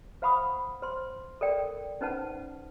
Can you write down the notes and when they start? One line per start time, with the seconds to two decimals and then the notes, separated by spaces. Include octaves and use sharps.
0.22 C5 F5 F#5 B5 C#6 D#6
0.82 C5 C6
1.41 A4 A#4 D5 G5
2.01 C#4 D#4 B4 C5 F#5 A5